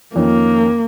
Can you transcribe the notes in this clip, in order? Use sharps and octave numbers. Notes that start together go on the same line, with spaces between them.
F2 D#3 A#3 C#4 F4 A#4